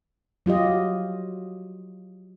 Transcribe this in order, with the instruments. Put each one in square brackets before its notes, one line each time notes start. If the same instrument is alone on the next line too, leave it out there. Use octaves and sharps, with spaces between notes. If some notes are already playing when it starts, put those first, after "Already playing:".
[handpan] F#3 F4 G4 D#5